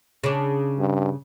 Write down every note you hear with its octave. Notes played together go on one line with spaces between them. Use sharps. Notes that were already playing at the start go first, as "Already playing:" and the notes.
C#3 D4
G2